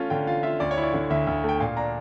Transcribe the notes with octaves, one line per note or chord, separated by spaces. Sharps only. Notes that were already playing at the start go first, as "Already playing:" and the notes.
Already playing: A3 C#4 F4
D3 G5
F4 F5
F4 E5
D2 D5
C#5
E4
D5
D3
D2 E5
D2
A3 G5
A#2 F5
D4 A#5